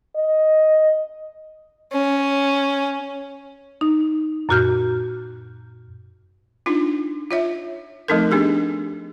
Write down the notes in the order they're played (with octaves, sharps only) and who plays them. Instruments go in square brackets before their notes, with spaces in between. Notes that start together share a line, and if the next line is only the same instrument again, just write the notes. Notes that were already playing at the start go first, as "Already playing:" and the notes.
[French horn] D#5
[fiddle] C#4
[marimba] D#4
F#2 A#2 F#4 F6 G6
[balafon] D4 D#4 F4
F4 C#5 E5
F3 A3 C4 D#4 A4 A#4
B3 D4 G4 G#4